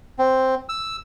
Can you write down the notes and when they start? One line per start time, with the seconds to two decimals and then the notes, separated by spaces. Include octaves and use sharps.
0.19 C4
0.69 E6